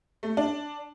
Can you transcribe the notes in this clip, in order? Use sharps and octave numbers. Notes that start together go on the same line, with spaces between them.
A3
D4